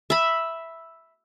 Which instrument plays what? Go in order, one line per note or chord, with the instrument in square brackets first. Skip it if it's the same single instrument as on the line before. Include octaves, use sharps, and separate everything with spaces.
[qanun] E5 B5